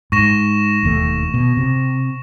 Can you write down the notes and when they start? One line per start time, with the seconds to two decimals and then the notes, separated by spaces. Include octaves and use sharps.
0.12 G#2 C#6 A#6 E7
0.83 E1 D#2 A3
1.34 B2
1.57 C3